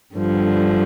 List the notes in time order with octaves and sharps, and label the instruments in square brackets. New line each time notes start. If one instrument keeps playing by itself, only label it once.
[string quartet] G2 D3 F3